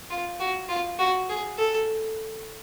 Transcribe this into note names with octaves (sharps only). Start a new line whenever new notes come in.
F4
F#4
F4
F#4
G#4
A4